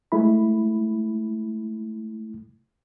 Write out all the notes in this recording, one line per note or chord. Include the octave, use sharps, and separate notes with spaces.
G#3 A3 E4 B5